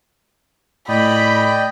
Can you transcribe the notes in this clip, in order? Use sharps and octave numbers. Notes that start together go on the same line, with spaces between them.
A2 D5 D#5 G5 B5